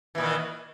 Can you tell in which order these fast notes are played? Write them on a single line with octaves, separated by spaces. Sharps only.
E3 A#2 D#3